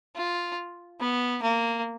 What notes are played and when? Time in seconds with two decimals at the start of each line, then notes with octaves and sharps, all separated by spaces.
0.16 F4
1.00 B3
1.43 A#3